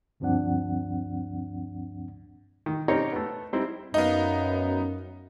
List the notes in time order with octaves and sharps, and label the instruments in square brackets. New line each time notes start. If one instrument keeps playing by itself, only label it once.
[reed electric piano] D2 G2 F3 C4 D4 F#5
[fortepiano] D#3
C4 C#4 D#4 G4 A#4 C#5
A3 B3
G3 C4 D#4 E4
[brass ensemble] F#2 [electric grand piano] B3 D#4 [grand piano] D#5 F5